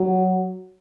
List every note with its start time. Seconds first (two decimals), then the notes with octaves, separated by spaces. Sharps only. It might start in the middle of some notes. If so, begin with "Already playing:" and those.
Already playing: F#3